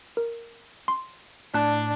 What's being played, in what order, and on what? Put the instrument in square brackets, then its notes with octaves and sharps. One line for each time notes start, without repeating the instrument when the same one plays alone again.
[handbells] A#4
C6
[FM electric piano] A2 [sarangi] D4 [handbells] A5 F#6